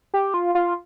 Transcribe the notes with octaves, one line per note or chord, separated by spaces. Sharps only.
G4
F4
F4